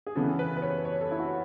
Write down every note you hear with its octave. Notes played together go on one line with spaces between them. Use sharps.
G#4
C#3 E3 B3 A4
B4
B4
C#5
C#5
A4
E4
F#4